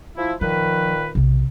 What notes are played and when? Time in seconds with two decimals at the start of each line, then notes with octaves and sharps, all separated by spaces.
0.17 F3 E4
0.41 A#2 D#3 F3 B4
1.15 B1 C3